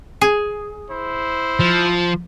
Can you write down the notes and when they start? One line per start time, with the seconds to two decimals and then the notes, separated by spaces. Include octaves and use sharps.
0.21 G#4
0.90 E4 C5
1.60 F3